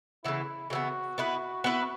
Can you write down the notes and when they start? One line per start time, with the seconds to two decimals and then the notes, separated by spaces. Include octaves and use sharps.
0.24 C#3 E3 B3 E4
0.70 C#3 E3 B3 F#4
1.18 B3 E4 B4
1.64 B3 E4 B4